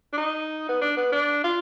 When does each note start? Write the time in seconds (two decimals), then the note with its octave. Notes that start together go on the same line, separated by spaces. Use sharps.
0.13 D4
0.18 D#4
0.69 B3
0.81 D4
0.97 B3
1.12 D4
1.44 F4